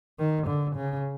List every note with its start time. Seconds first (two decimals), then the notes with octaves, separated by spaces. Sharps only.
0.19 D#3
0.47 D3
0.76 C#3